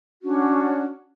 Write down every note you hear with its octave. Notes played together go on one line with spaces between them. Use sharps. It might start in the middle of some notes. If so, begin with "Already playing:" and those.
C#4 D4 F#4